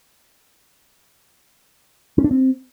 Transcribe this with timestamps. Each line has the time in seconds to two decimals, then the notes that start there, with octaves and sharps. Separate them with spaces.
2.18 C#4
2.24 D4
2.31 C4